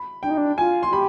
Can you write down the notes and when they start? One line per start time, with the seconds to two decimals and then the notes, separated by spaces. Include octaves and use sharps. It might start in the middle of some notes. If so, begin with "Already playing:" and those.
Already playing: B5
0.23 D4 G5
0.31 D#4
0.38 D4
0.58 F4 G#5
0.83 C6
0.89 F4
0.93 G4 B5